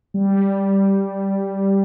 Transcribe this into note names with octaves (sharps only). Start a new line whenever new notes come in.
G3